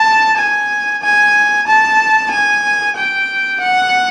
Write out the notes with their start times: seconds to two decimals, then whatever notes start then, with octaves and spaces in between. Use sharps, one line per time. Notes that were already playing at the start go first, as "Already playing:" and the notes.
Already playing: A5
0.38 G#5
1.02 G#5
1.67 A5
2.31 G#5
2.97 G5
3.61 F#5